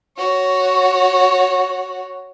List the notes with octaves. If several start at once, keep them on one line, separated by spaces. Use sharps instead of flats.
F#4 C#5